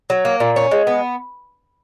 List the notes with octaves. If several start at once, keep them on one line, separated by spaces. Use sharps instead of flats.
F#3
A#3
A#2
C#4
G#3
B3